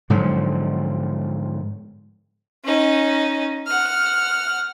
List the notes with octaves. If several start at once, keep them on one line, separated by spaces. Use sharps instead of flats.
G#2 D3 F3 F#3
C#4 D#4
F#5 F6